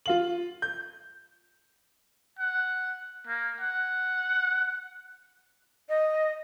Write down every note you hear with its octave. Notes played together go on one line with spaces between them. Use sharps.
F4 F5 F#7
G6
F#5
A#3
F#5
D#5